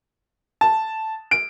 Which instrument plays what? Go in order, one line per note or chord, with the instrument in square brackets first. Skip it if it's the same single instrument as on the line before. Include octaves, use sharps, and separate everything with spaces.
[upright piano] A5
D7